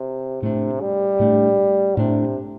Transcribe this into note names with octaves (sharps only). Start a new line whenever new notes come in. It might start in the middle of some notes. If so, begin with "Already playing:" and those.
Already playing: C3
A2 C3 A3 D4
G3
A2 A3 D4
A2 C3 A3 D4